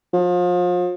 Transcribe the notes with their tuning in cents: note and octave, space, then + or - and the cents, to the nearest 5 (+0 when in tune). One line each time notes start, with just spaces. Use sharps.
F3 +35